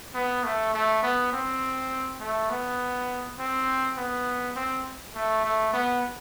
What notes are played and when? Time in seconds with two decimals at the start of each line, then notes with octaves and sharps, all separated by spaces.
0.14 B3
0.44 A3
0.74 A3
1.03 B3
1.33 C4
2.20 A3
2.50 B3
3.39 C4
3.97 B3
4.56 C4
5.15 A3
5.44 A3
5.73 B3